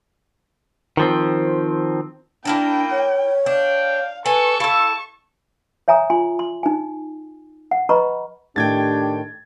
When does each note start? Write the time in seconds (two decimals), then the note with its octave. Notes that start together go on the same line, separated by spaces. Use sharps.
0.97 D#3 F3 C4
2.45 A#3 D4 E4 A#4 G5 A5
2.91 C#5
3.46 D4 F5 G5
4.26 A4 B4 G#5 C#6
4.60 E4 A4 F5 A5
5.88 C#5 E5 G#5 A#5 D#6
6.10 F4 G#5 C6
6.39 C6
6.63 D#4 G#5
7.71 F#5
7.89 B4 D#5 A#5 B5 C#6
8.56 A2 D#3 A3 D4 G4 G5 G#6 A6